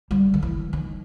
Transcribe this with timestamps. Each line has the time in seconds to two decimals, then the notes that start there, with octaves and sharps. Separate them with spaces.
0.11 G3
0.34 D#3
0.42 E3
0.73 D#3